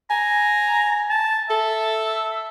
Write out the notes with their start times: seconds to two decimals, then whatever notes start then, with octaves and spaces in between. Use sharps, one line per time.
0.10 G#5 A#5
1.10 A5
1.50 A4 E5